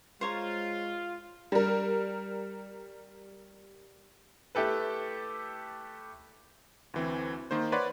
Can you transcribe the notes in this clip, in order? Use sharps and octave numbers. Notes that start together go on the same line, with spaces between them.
G#3 F4 C5 C#5 A#5
G3 A#4
A3 E4 G4 A4 B4
D2 E3 C4
D#3 A#3 C5
B4 C#5 D5 F#5 B5 C6